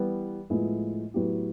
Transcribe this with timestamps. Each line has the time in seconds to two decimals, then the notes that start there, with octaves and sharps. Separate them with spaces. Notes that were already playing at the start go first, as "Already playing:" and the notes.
Already playing: E3 G3 B3
0.50 A2 F3 G#3 B3 E4
1.14 A2 F#3 B3 E4 G4